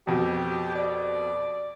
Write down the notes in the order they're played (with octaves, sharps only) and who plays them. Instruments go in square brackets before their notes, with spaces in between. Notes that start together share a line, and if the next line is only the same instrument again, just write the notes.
[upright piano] F2 B2 [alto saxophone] G4
[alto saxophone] D5